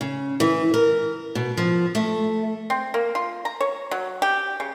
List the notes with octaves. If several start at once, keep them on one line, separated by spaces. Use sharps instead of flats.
C#3
E3
A#4
B2
F3
A3
C4
A#3
F4
A#5
C#5
F#3
G4
C#3